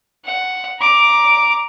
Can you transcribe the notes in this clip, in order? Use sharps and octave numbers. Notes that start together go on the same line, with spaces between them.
F#5
A#5 D6